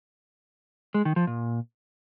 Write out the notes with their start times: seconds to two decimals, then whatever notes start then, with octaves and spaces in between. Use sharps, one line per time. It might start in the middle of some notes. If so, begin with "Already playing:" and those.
0.94 G#3
1.05 D#3
1.16 F3
1.27 A#2